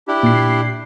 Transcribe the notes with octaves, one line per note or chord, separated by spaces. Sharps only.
D4 E4 G4
A#2 C7